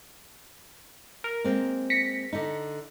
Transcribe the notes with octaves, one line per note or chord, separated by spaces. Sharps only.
A#4
G#3 A#3 C4
A#6 B6 C#7
D3 D#4